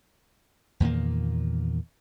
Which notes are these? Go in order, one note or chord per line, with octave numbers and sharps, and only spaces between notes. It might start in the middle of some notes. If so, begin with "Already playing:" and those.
E2 A#2 D#3 A#3